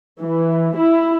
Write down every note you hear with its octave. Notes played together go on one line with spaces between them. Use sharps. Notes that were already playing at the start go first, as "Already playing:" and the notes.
E3
E4